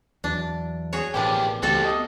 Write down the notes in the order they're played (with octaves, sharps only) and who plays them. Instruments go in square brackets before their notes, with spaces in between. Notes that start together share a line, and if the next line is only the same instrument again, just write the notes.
[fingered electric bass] E2 F#3 [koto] D4
[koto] F#4 G#4 C#5
[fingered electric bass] A1 B2 [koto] E3 F3 D4 [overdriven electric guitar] A#3 G4 [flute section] D6
[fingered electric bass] C#2 E3 A3 [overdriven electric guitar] G3 C4 [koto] F#4 A4
[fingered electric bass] B3 [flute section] D#5